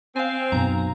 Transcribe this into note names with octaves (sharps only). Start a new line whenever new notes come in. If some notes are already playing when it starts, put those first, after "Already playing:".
C4 F5 G#5
B1 F#2 B2 A#5